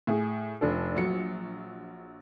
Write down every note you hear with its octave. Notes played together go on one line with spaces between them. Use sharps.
A2 G#4
F1 D4 A4
A#1 F#3 C#7